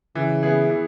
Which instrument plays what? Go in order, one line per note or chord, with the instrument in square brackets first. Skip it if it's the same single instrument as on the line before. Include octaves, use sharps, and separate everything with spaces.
[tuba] C#3 [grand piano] E3
[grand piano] B3 E4 G#4
E3